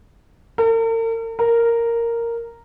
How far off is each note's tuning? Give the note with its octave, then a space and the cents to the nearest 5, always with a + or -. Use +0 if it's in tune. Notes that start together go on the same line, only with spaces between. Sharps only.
A#4 -45
A#4 -5